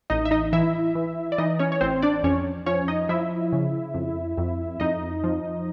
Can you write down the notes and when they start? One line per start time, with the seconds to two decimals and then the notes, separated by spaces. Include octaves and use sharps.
0.10 A1 D#4 D#5
0.25 E5
0.31 D#4 D#5
0.53 E3 E4 E5
0.95 E3
1.32 D5
1.38 E3 D#4 D#5
1.59 C#4 C#5
1.72 C#5
1.81 A1 C4 C5
2.02 D4 D5
2.23 F2 C#4 C#5
2.66 F3 C#4 C#5
2.88 D#4 D#5
3.09 F3 E4 E5
3.53 C#3
3.94 F2
4.38 F2
4.80 F2 D#4 D#5
5.24 F3